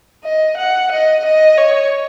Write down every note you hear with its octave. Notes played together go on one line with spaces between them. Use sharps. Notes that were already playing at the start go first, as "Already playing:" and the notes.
D#5
F#5
D#5
D#5
C#5